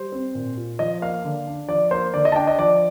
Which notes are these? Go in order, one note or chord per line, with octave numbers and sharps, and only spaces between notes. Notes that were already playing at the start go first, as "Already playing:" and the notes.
Already playing: G3 C5
C4
A#2
F4
F3 D#5
A#3 F5
D3
D4
F3 D5
A#3 C5
D3 D5
D#5
A5
D4 G5
D#5
F3 D5